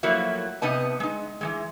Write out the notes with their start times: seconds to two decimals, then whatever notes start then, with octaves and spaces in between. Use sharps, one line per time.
0.03 F3 F#3 A3 A#3 E4 F#4
0.62 C3 B3 D#4 D#5 A5
1.00 G#3 D#4
1.41 E3 G3 G#3